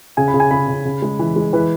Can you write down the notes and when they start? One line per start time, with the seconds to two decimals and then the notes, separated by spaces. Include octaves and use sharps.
0.17 C#3 G#5
0.28 B5
0.34 C#3
0.40 G#5
0.51 C#3 B5
0.68 C#3
0.85 C#3
1.02 G#3
1.19 E3
1.36 G#3
1.53 E3 B4